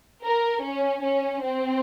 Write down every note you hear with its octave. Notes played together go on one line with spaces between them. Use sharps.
A#4
C#4
C#4
C4